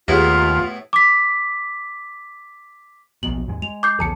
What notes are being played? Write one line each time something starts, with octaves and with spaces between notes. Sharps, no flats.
D#2 A2 B3 E4 F4 G4 G#4
D6 B6
D1 A#1 B2 F#7
D#2 G#2 G#3
G#3 F7
D6 G6 C7
B1 E2 C#3 A4 A5 C#7